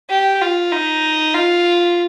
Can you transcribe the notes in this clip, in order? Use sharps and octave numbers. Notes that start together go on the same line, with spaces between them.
G4
F4
D#4
F4